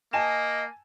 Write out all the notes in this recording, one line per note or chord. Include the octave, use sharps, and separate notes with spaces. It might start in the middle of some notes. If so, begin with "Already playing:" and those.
A#3 D#5 G#5 A5 E7